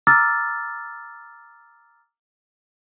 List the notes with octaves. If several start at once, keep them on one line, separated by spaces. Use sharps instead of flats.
A#5 D6 E6 F6 A6